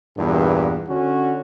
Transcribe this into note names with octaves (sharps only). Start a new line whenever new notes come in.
E2 G2 A#2
D3 C#4 F#4